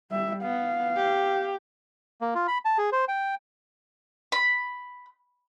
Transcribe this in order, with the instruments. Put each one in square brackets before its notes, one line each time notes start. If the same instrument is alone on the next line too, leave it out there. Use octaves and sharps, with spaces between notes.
[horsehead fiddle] G3 E5
[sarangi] B3 [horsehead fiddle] F5
[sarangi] G4
[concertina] A#3
F4
B5
A5
G#4
C5
G5
[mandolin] B5